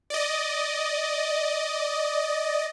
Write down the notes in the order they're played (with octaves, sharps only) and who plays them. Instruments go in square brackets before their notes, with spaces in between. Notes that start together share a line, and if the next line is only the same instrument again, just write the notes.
[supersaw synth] D5 D#5